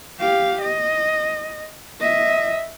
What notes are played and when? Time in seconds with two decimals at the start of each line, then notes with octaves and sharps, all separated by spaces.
0.20 G4 F5
0.61 D#5
2.00 D#5 E5